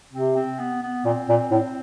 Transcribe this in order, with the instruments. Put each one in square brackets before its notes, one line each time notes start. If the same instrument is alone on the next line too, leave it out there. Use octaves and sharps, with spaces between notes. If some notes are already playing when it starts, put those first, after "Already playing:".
[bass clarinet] C3 [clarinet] C4
[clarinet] C4
B3
B3
[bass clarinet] A#2 [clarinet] C4
[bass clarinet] A#2
A2